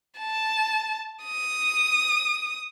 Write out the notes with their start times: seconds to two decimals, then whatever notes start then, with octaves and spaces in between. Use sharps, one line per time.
0.19 A5
1.23 D#6